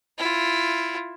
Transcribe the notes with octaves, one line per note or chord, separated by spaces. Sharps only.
E4 F4